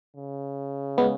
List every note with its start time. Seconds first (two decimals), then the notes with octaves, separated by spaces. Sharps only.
0.16 C#3
0.98 G#3 B3